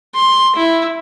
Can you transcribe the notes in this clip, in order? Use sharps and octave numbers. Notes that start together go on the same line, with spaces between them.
C6
E4